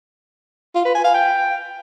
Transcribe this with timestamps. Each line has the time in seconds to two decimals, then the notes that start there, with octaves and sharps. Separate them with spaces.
0.75 F4
0.85 B4
0.95 G#5
1.05 F5
1.14 G5